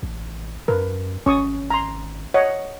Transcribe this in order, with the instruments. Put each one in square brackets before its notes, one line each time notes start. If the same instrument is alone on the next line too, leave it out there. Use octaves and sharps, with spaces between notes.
[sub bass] A1
[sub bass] F#2 [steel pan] A#4 B4
[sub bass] G#1 [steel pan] C#4 C#6 D#6
[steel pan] A#5 C6
C#5 D#5 F#5